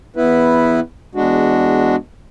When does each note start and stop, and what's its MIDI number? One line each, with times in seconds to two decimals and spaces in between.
0.16 0.80 40
0.16 0.80 59
0.16 0.80 64
0.16 0.80 71
1.15 1.96 40
1.15 1.96 56
1.15 1.96 62
1.15 1.96 66